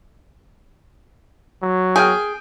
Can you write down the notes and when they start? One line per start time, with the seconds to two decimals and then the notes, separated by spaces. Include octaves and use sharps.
1.63 F#3
1.96 G#4 G5 G#5 F6